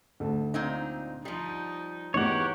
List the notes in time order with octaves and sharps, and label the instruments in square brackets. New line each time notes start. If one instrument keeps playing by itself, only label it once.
[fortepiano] D2 A4
[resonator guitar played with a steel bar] A#2 C4 D#4
[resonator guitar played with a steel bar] F3 G3 [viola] D#4
[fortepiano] E2 E3 D#4 [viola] G4 A#4 [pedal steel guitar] C#5 F#5